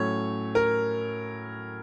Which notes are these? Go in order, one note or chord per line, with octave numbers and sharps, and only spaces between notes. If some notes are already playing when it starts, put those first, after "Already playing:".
Already playing: A2 F#3 A3 C#4 C#5
A#4